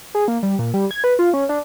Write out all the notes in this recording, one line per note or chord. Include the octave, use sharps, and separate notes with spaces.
G#4
A#3
G3
A#2
G3
G#6
B4
F4
C#4
D4